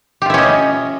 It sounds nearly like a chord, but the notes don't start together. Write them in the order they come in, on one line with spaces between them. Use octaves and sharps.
G4 F4 E4 C#4 D#5